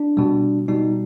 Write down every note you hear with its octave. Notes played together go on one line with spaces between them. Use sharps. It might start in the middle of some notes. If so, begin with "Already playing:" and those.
Already playing: D4
B2 G3
B2 G3 D#4